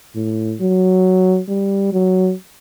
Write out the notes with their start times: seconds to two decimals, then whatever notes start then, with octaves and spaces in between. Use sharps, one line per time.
0.15 A2
0.61 F#3
1.48 G3
1.93 F#3